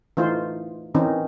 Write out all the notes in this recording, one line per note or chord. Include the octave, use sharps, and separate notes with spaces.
E3 A3 D#4 F4 C5
D#3 E3 C4 C#4 D#4